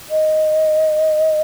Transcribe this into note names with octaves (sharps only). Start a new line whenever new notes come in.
D#5